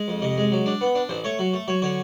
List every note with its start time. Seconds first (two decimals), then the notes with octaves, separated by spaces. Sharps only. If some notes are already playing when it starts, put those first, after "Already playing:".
Already playing: G#3
0.08 F2
0.22 C3 D#5
0.37 G#3
0.52 F#3
0.66 D4
0.81 B3
0.95 D4
1.09 A1 C5
1.24 A3 C#5
1.39 F#3
1.53 A3
1.68 F#3 C#5
1.82 D3 C#5